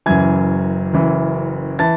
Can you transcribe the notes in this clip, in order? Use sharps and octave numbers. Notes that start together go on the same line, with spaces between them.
F#1 F#2 E3 G#5 G#6
F#1 F#2 E3
E3 A5 A6